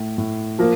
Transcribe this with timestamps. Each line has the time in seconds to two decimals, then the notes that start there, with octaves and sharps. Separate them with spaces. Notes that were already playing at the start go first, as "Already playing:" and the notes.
Already playing: A2
0.18 A2
0.59 F3 A#3